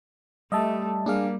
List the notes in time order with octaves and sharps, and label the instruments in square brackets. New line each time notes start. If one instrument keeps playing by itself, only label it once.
[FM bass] G3 [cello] A3 [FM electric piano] D#5 E5 A5
[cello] G3 [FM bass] A#3 [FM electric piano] D4 G#4 F5